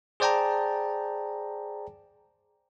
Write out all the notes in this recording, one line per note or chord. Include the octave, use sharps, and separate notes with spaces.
G#4 C5 D5 G5 A5 A#5